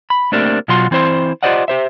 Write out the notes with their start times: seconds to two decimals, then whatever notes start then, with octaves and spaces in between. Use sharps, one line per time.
0.10 B5
0.32 A3 A#3 C4 D4 G4 A#4
0.68 B2 F#3 F4 F#4 C6
0.91 E3 C4 E4 C5 C6
1.43 F4 G4 C5 D5 D#5 F#5
1.68 G4 C5 E5